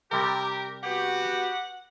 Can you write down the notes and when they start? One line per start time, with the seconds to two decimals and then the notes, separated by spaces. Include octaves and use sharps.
0.11 C3 G3 G4 A#4 A#5
0.83 B3 F#4 G4 F#5